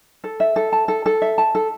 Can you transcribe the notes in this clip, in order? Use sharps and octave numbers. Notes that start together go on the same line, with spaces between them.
A4
E5
A4
A5
A4
A4
E5
A5
A4